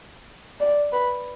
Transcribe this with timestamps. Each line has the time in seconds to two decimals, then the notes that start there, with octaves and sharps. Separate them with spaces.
0.60 D5
0.92 B4